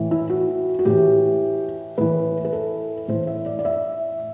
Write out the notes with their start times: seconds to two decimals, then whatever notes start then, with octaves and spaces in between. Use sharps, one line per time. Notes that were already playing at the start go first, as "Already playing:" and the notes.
Already playing: A2 E3
0.11 E4
0.30 F#4
0.79 F#4
0.85 A2 E3 G4
1.98 A2 E3 B4
2.45 B4
2.53 A4
3.08 A2 E3 C5
3.27 E5
3.46 D5
3.59 D5
3.65 E5